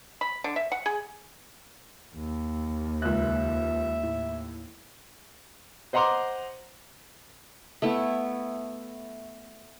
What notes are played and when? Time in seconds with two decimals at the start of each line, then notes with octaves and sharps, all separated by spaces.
0.21 B5
0.44 D3
0.56 E5
0.72 F#5
0.86 G#4
2.15 D#2
3.02 C#2 A#4 E5 F#6
4.03 A2
5.93 C5 D#5 F#5 A#5 C6 D6
7.82 A3 B3 E4